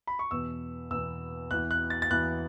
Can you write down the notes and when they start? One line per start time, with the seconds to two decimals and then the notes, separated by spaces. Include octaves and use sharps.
0.07 B5
0.19 C#6
0.31 E2 B2 B3 E6
0.91 E2 B2 B3 E6
1.51 E2 E3 B3 F#6
1.71 F#6
1.90 A6
2.02 A6
2.11 E2 E3 B3 F#6